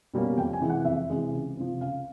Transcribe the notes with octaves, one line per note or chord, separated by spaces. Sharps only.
B2 G3 A#3 C#4
F2 G5
G#5
C3 E3 G#3
F#5
F2 E5
C3 E3 G#3
C#2
C3 F3
C#2 F5